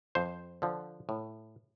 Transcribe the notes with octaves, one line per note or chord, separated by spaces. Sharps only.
F2 C5
D3 F3
A2